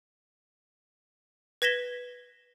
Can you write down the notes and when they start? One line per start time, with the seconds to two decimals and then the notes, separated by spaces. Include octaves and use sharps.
1.62 B4 G#6 A#6 B6 E7 G7